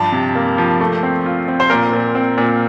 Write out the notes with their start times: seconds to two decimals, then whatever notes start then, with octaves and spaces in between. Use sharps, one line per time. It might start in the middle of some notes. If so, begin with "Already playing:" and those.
Already playing: G2 F3 A5
0.12 C3
0.35 A#3
0.58 F3
0.80 A3
1.03 C4
1.26 F4
1.48 C4
1.60 C5
1.70 A#2 A#4
1.93 A#2
2.15 C4
2.38 A#2